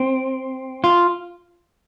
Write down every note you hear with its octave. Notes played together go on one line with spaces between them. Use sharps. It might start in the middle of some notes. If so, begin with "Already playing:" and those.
Already playing: C4
F4